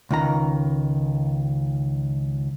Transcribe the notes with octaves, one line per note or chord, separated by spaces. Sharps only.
C#2 D#3 A#5